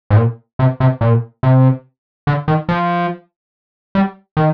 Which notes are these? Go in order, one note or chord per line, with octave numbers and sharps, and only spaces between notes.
G#2
A#2
C3
C3
A#2
C3
D3
D#3
F3
G3
D#3